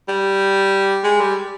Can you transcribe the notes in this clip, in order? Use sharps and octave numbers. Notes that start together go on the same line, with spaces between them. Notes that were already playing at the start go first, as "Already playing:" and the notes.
G3
G#3
G3